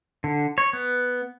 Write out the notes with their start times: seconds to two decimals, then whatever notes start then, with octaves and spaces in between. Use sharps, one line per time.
0.24 D3
0.58 C#5
0.73 B3